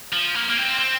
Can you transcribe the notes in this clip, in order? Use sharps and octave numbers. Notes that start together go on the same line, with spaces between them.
F3
A#3
A#3
C4
C4